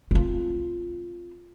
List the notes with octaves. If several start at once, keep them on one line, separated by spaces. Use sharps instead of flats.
C4 F4